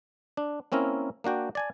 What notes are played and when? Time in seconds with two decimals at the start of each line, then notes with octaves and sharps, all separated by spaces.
0.37 D4
0.72 A#3 C4 C#4 E4 A#4
1.24 A#3 D4 F#4 G5
1.55 D5 G#5 A5